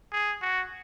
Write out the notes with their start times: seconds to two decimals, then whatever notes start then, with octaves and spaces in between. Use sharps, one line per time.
0.12 G#4
0.42 F#4